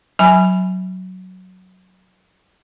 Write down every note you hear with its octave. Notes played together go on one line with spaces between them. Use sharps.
F#3 G#5 B5